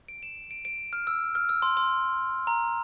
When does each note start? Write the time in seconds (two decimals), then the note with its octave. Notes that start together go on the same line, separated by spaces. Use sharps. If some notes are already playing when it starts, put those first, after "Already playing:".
0.08 D7
0.23 E7
0.51 D7
0.65 D7
0.93 F6
1.07 E6
1.35 F6
1.49 E6
1.62 C6
1.77 C6
2.47 A#5